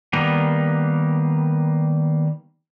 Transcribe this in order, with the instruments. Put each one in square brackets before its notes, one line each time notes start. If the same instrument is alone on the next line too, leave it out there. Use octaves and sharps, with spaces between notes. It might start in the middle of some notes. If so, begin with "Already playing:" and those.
[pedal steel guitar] D#3 G3 A#3 B3